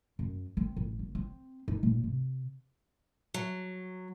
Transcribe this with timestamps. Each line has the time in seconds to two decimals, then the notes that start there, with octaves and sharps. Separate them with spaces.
0.19 F#2
0.57 C4
0.77 A1
0.99 F#1
1.15 C4
1.68 D#4
1.83 A#2
2.03 C3
3.34 F#3